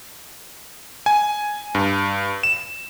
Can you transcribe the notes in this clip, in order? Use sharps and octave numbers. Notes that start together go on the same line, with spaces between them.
G#5
G2
E7